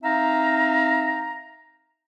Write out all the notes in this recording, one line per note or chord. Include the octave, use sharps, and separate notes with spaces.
C4 D#4 E5 F5 A#5